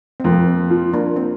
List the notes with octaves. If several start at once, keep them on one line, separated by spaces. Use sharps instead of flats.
C4
F2 A#3
C4
F3
A#3 D4
C4